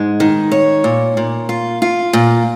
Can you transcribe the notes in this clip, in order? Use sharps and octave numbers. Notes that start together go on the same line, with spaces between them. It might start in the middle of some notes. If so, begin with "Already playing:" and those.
Already playing: G#2 G#3
D#3
C#5
A#2
A#2
F4
F4
A#2